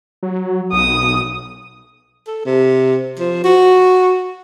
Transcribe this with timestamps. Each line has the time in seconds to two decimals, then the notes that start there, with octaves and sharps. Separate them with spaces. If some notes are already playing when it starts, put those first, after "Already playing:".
0.23 F#3
0.73 B1 D#6
2.27 A4
2.45 C3
3.19 F3
3.44 F#4